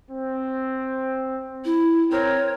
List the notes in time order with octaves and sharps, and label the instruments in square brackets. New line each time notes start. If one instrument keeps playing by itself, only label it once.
[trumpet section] C4
[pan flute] E4
[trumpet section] C4 A#4 [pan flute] C#5